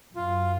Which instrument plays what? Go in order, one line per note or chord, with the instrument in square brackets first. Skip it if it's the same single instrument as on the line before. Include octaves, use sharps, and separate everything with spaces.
[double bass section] F#2 [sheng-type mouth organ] F4